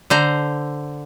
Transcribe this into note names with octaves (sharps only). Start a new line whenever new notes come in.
D3 C5 A#5